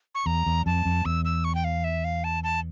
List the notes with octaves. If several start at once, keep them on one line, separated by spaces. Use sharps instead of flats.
C#6
E2 A#5
E2
F2 A5
F2
E2 E6
E6
C#6
G5
F5
E5
F5
A5
A5